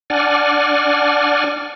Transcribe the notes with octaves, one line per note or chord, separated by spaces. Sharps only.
D4 D5 F#5 G#5 F6